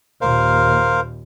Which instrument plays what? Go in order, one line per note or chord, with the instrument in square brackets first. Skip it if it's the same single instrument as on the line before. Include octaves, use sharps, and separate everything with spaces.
[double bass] D#2 A#2 [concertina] A#4 C5 F5